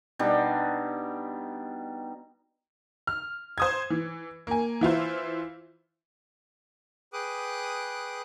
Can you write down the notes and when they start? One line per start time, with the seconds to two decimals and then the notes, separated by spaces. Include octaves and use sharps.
0.19 B2 G3 D4 D#4
3.07 F6
3.58 C5 D#6 G#6
3.90 E3
4.47 A#3 G#5
4.81 E3 E4 F4 C5
7.13 G#4 B4 G5 D6 D#6 F#6